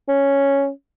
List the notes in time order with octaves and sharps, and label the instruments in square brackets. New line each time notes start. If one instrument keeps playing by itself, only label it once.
[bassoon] C#4